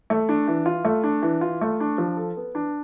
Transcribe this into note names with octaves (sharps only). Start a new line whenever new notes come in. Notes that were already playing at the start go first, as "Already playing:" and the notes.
A3
D4
E3
F4
A3
D4
E3
F4
A3
D4
F3
A4
B3
D4